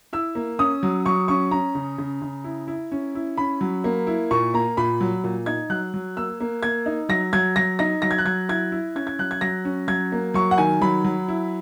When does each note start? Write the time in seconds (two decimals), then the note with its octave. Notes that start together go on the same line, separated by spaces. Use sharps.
0.13 E4 E6
0.35 A#3
0.59 C#4 D#6
0.83 F#3
1.06 F#3 C#6
1.28 C#4 C#6
1.51 C#4 A#5
1.75 C#3
1.98 C#3
2.22 C#3
2.44 E4
2.68 E4
2.92 C#4
3.15 E4
3.37 C#4 B5
3.61 F#3
3.84 A#3
4.07 E4
4.31 A#2 C#6
4.54 A#3 A#5
4.77 A#2 B5
5.01 F#3
5.24 A#2
5.46 D#4 G#6
5.70 F#3 F#6
5.94 F#3
6.17 A#3 E6
6.40 A#3
6.63 A#3 G#6
6.86 D#4
7.09 F#3 A#6
7.33 F#3 G#6
7.56 F#3 A#6
7.79 D#4 A#6
8.02 F#3 A#6
8.11 G#6
8.18 F#6
8.25 F#3 G#6
8.49 E4 G#6
8.72 E4
8.95 C#4 G#6
9.07 G#6
9.19 F#3 F#6
9.31 G#6
9.41 F#3 A#6
9.65 C#4
9.88 F#3 G#6
10.12 A#3
10.34 F#3 C#6
10.51 F#5
10.58 D#3 G#5
10.81 F#3 B5
11.04 F#3
11.28 E4